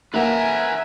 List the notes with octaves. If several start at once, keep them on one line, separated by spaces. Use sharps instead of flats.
A#3 B4 E5 F#5 G#5 A#5